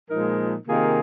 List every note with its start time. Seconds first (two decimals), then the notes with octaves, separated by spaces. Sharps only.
0.09 A#2 F3 G#3 D#4 A#4
0.66 C3 D#3 A#3 F4 G#4